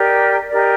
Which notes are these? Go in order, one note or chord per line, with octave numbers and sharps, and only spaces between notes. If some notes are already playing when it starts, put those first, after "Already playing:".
Already playing: D#4 G4 A#4 D5
D#4 G4 A#4 D5